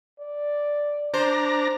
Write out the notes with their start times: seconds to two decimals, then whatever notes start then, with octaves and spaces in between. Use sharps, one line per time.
0.20 D5
1.14 D4 C5 A#5